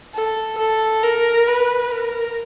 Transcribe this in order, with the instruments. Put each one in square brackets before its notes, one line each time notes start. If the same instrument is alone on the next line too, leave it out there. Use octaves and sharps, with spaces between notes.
[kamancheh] A4
A4
A#4
B4
A#4